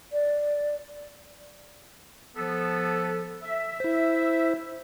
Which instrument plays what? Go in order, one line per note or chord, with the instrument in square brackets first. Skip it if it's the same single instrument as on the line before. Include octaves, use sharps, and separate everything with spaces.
[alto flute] D5
[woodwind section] F3 B3 A4
E5
[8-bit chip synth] E4 C5